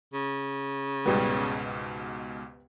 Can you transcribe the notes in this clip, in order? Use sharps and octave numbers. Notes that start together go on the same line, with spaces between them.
C#3
C#2 G#2 B2 G3 B3